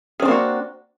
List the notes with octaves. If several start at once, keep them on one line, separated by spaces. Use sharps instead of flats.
A#3 C4 D4 F#4 G#4